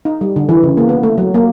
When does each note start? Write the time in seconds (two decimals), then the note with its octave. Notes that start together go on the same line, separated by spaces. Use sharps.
0.05 D#4
0.21 G3
0.36 D3
0.49 E3
0.63 C#3
0.77 A#3
0.89 B3
1.03 A3
1.18 F#3
1.34 A#3